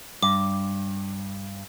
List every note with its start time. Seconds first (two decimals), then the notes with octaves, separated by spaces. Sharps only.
0.23 G2 D6